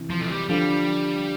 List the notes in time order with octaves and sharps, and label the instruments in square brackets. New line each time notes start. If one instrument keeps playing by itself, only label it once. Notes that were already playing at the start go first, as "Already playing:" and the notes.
Already playing: [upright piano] C3 E3
[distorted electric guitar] F3
A3
G3
[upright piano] D3 F3 [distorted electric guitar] G3